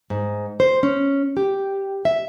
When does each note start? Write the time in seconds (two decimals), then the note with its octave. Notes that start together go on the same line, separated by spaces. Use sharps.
0.10 G#2
0.60 C5
0.83 C#4
1.37 G4
2.05 E5